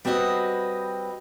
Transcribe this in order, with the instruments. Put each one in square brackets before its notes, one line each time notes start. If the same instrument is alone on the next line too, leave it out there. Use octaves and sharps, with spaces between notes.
[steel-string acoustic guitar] G3 C4 F#4 B4 D#5